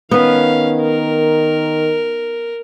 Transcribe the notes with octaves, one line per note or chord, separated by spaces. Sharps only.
D#3 B3 C#4 B4 F5
A#4